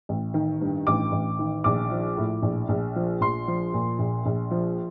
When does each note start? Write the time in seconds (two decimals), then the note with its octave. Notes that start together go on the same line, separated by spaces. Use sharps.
0.09 A1
0.34 D#3
0.61 G2
0.87 A1 D6
1.12 A1
1.39 D#3
1.64 A#1 D6
1.91 F3
2.17 A2
2.42 A#1
2.69 A#1
2.96 F3
3.21 A#1 C6
3.48 F3
3.73 A#2
3.99 A#1
4.26 A#1
4.51 F3